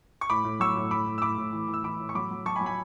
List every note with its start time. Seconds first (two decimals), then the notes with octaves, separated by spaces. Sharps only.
0.21 C#6
0.30 A2 B5 D6
0.45 A2
0.60 F#3 C#6 E6
0.76 A2
0.91 A2 B5 D6
1.06 A2
1.18 E6
1.22 A2 B5 D6
1.38 A2
1.53 E3
1.68 E3
1.74 E6
1.84 E3 B5 D6
2.00 A2
2.09 C#6
2.15 F#3 B5 D6
2.31 F#3
2.46 F#3 A5 C#6
2.56 G#5 B5
2.61 F#3
2.66 G#5 B5